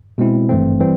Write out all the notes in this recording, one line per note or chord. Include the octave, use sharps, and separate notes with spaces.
B2 G#3 C4 E4
G#1 G2 E3 A3 C4
E3 G3 C4